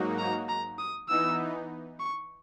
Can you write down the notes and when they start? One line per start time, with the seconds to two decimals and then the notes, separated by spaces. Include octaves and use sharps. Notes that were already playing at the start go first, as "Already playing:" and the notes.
Already playing: G#2 F#3 A#3 D#4 F#4
0.18 A#5
0.49 A#5
0.79 D#6
1.09 E3 B3 D#4 E6
2.00 C#6